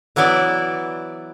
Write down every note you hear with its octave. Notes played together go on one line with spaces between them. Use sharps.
E3 F#3 B3 E4 D5